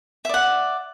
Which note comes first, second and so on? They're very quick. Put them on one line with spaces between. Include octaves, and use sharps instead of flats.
E5 D5 F#5